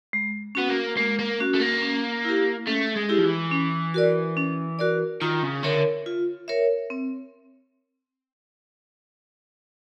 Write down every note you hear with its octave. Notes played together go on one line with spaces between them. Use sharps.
G#3
B3 C#4 F#4
A#3
G#3 A#3
A#3
C#4 F#4
A3
A#3
C#4
E4 G4
A3 C#4
G#3
E4 G4
F3
E3
C#4
F#4 A#4 D5
C#4
F#4 A#4 D5
D#3 F4
C#3
D3 A#4 C#5 E5
F4
A#4 C#5 E5
C4